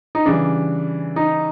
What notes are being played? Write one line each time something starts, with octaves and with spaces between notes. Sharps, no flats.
D#4
C#3 E3 G3 D4
D#4